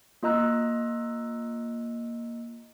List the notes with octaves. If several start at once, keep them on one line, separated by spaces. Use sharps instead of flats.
A#3 F4 D#5 A#5 E6 F#6